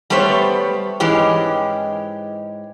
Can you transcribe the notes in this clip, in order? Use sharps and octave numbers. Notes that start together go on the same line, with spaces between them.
G3 A3 B3 C5 C#5
G#2 E3 G#3 C#4 G4